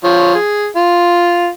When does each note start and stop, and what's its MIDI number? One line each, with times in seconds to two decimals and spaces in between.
0.04 0.34 53
0.04 0.34 73
0.35 0.67 68
0.76 1.49 65